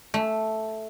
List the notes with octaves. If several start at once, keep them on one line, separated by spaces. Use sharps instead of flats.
A3